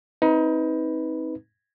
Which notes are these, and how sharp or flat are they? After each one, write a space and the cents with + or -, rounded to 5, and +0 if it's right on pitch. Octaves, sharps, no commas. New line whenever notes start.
C4 +15 D#4 +30 B4 +0